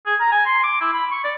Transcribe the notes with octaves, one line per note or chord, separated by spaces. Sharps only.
G#4
A#5
G#5
C6
D6
E4
B5
C#6
D5